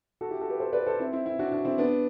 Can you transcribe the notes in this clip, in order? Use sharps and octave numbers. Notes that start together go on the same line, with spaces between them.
F#4 A4
E4 G4
F#4 A4
G4 B4
A4 C5
B4 D5
A4 C5
C4 E4
C4 E4
C4 E4
D4 F#4
D4 F#4
C4 E4
B3 D4